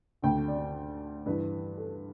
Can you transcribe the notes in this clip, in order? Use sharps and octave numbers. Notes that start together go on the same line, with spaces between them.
D2 D3 G5
D5
G2 E3 B4
A4